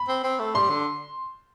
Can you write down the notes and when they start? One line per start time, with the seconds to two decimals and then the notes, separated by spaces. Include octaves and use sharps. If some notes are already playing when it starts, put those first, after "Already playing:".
Already playing: B5
0.08 C4
0.24 C4
0.39 A3
0.55 G3 C6
0.70 D3